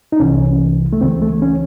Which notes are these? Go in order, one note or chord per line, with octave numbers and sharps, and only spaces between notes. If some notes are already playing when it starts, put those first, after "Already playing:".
D#4
C2 C3 E3 C#4
A3
C#2 C#3 E3 C4
A3
C#4